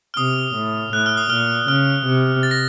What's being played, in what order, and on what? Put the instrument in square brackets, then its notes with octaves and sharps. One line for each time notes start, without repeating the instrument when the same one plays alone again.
[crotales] F6
[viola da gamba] C3 [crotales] D#6
[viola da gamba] A2
[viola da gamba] A2 [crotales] F#6
[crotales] F6
D#6
[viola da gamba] A#2 [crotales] F6
[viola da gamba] C#3 [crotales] F6
[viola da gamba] C3
[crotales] A6
A#6